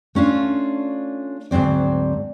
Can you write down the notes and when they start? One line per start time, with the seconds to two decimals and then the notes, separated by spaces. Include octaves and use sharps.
0.15 A3 C#4 D4 F4
1.51 D2 G#2 F#3 C4 D5